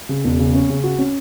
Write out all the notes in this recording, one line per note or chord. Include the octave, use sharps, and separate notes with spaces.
C#3
E1
C#3
C#4
C#3
F#4
C#4